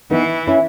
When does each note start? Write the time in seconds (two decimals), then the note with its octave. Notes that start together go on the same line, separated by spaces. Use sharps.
0.11 E3 B3 D#4
0.47 C#4 E4